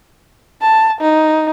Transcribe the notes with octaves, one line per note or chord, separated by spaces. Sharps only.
A5
D#4